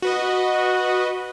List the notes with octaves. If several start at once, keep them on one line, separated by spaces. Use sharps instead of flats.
F#4 B4 D#5